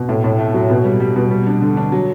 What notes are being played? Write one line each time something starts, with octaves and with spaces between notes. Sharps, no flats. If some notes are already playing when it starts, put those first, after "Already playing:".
Already playing: B2
A2
A2
A3
F#3
B2
G3
G3
B2
G3
D4
D3
D4
F#3